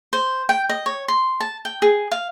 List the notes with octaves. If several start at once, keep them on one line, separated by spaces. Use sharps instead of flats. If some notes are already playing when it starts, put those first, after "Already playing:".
C5
G5
D#5
C#5
C6
A5
G5
G#4
F5